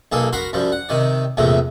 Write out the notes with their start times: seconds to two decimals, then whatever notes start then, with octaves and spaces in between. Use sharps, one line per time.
0.12 B1 A#3 G#4 A4
0.33 F#4 A#4 B5 C6
0.53 F#2 F3 G3
0.72 F#5
0.89 C3 D#3 D5
1.37 A#1 E2 A2 C3 A3